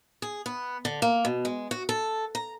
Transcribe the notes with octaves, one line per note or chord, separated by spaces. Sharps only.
G#4
B3
D3
A#3
B2
G#3
F#4
A4
A#5